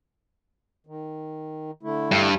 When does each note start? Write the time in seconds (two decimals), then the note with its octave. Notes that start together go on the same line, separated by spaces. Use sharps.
0.87 D#3
1.83 D3 A3 E4
2.11 G2